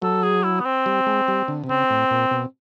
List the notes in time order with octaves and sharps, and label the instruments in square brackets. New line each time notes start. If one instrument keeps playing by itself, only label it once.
[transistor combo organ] F#3 [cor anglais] A4
[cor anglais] G#4
E4
B3
C4
[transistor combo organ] G3
G#3
G3
D3
C3
[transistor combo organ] C#3 [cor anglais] C4
[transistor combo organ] A2
A#2
B2